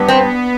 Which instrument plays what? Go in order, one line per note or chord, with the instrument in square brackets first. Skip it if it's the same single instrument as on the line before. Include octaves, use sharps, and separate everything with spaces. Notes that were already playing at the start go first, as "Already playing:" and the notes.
Already playing: [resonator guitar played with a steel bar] G2 [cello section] B3
[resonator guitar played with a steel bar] C4